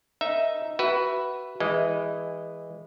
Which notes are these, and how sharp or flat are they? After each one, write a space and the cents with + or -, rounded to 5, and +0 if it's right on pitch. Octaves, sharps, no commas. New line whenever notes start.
D#4 +0 A#4 +0 E5 +0
F#4 +30 B4 +0 E5 +15
E3 +0 G#3 -20 D#5 +0